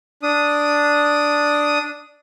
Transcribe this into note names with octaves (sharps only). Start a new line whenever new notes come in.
D4 D#6